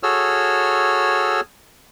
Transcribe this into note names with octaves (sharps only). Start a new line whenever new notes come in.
F#4 G#4 A4 C#5 E6 F6